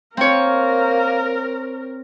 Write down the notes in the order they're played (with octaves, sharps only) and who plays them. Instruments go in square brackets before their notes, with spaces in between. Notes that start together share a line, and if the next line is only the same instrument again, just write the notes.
[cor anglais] A#3 [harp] C4 C#5 [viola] A#4